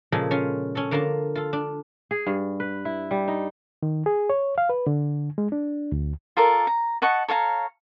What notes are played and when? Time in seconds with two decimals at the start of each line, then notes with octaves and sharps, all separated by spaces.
0.12 A#2 C#3 F3 G#3 G#4 A4
0.31 C#4 F4
0.75 C#4 A4
0.91 D3 A#3 F4 A#4 A5
1.35 F4 A4
1.53 D4
2.11 G#4
2.27 G2
2.60 B4
2.85 E4
3.11 G3
3.28 D#4
3.83 D#3
4.06 G#4
4.30 C#5
4.58 F5
4.69 B4
4.87 D3
5.38 G#3
5.52 D4
5.92 D2
6.37 F4 A4 A#4 D5
6.67 A#5
7.02 D#5 F#5 A5 C#6
7.28 A4 C#5 F5 A#5